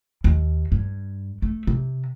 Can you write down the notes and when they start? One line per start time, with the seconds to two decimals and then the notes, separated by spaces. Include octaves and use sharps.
0.24 D#2
0.72 G2
1.42 A3
1.67 C3